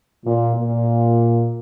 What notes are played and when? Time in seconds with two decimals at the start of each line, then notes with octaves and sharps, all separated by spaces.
0.25 A#2
0.57 A#2